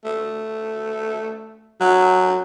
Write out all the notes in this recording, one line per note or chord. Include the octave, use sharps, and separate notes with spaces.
A3
F#3